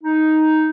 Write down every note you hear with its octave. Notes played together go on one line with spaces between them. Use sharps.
D#4